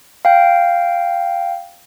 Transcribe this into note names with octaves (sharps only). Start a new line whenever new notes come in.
F5 G5